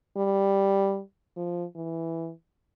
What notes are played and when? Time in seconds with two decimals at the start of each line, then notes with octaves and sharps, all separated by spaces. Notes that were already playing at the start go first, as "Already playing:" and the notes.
0.17 G3
1.37 F3
1.76 E3